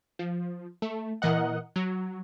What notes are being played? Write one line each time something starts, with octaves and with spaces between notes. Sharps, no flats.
F3
A3
A#2 E3 A#4 D#5 F#5
F#3